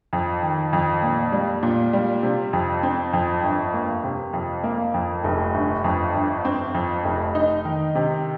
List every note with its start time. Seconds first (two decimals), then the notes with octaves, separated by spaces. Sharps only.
0.13 F2
0.43 D#3
0.73 F2
1.03 A#2
1.32 G3
1.63 A#2
1.93 G3
2.23 C3
2.53 F2
2.83 C4
3.13 F2
3.43 G1
3.74 A#3
4.04 C3
4.33 F2
4.64 A#3
4.94 F2
5.24 F1
5.54 G1
5.84 F2
6.14 G1
6.45 C4
6.74 F2
7.05 F1
7.35 D#4
7.65 D#3
7.95 C3